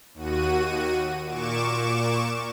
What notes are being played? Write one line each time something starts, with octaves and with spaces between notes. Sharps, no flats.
D#2 F#4 D#7
A#2 C#6 D6 E7